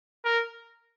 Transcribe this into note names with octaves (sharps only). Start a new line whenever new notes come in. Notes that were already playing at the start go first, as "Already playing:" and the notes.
A#4